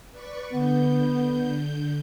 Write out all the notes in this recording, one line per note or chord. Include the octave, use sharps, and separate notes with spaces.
B4 D5 C#6
D3 B3 G6